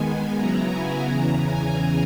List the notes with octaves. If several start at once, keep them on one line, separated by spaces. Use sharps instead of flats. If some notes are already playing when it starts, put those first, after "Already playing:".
Already playing: D#3 G#3 B3 G#5
C#3 F#3 B3 E4 A#5
G#5
E2 C#3 E3 A#5
G#5